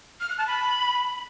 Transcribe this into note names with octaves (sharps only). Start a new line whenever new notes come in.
F6
F#6
A5
B5